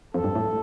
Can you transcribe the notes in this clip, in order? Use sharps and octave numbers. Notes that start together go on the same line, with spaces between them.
F2 A4
G2
A2